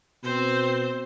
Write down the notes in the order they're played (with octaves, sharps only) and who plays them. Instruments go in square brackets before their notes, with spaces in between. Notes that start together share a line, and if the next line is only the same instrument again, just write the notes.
[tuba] B2 [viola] C4 C5